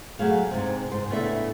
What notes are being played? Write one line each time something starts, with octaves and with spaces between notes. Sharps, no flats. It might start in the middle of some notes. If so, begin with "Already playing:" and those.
F#3 A3 G#4 F5
G#2 C3
G#2 C5
A2 C#3 A3 B3 D4 E5